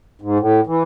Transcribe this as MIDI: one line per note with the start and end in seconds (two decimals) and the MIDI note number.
0.21 0.38 44
0.39 0.60 45
0.67 0.83 52